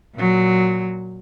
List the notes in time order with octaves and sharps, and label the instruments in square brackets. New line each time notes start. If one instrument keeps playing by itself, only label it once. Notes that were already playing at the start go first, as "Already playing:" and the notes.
[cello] A#2 F#3